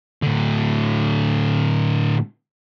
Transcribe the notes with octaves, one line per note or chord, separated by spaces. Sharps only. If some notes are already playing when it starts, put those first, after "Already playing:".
A2 D3